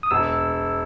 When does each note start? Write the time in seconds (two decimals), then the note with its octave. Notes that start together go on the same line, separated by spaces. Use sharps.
0.03 D#6
0.11 E1 E6